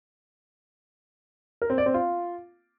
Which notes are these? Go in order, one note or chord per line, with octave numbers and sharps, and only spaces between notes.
A#4
C4
D5
C4
F4